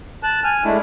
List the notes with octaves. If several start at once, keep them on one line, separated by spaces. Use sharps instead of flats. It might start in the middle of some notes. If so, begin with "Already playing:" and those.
A5 F#6
G#5 F6
G#3 A3 D4 E4